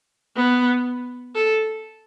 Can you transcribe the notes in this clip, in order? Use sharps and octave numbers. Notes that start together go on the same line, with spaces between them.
B3
A4